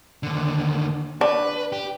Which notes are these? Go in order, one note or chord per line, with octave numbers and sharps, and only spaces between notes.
D#2 D3
D4 B4
G4